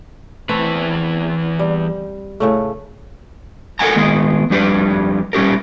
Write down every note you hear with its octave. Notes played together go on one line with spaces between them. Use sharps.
E2 E3 A3 C4 A4 B4
G3
A2 C#3 A3
A4 A#4 E5 F#5 G#5 A#5
D#3 G#3 B3 G#4 A#4
F2 G3 D4 G4 B4
G3 C#4 G4 A#4